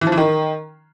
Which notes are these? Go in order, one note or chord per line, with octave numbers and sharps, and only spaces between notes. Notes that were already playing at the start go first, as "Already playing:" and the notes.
E3
F3
E3
D#3